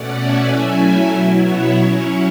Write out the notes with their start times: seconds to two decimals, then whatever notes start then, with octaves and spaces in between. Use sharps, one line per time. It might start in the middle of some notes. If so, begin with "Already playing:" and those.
Already playing: B2 A3 C#4 D5 F#5
0.15 E5 G#5
0.47 F#3 A3 C#4 E4 E5 G#5
1.11 B2 F#3 B3 E4
1.44 C#5 E5
1.76 F#3 C#4 E4 C#5